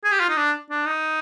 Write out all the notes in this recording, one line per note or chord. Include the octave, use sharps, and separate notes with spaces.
G#4
G4
F4
D#4
D4
D4
D#4